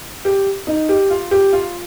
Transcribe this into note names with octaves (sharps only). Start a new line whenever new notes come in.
G4
D#4
G4
F4
G4
F4